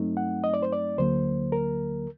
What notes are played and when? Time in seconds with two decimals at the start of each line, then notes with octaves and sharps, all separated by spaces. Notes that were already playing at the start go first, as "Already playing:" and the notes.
Already playing: G2 F#3 A3 C4 D#4
0.17 F#5
0.44 D#5
0.54 D5
0.63 C5
0.73 D5
0.98 D2 D3 F#3 A#3 C5
1.52 A#4